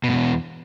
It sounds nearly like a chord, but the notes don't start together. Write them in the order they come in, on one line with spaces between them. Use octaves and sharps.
B2 G2 E2